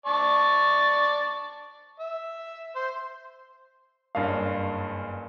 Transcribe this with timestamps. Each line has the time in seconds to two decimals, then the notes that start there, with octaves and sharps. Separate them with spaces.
0.06 D5 A5 C#6
2.00 E5
2.76 C5
4.15 F#1 G2 C#4 F5